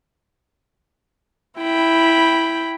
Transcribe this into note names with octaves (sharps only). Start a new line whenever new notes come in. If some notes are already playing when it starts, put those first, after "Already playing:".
E4 G5 B5